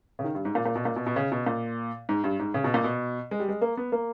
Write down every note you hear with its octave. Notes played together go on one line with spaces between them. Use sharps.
C#3
D#3
G2
G#2
A#2
A#2
B2
A#2
B2
B2
C#3
B2
A#2
G#2
G2
G#2
C#3
B2
A#2
B2
G#3
G3
G#3
A#3
B3
A#3